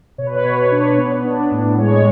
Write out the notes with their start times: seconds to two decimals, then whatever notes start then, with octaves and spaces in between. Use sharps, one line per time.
0.18 B2 C#5
0.27 B4
0.35 C#5
0.45 B2
0.72 D4
0.98 B3
1.25 D4
1.52 A2
1.78 G#3 C#5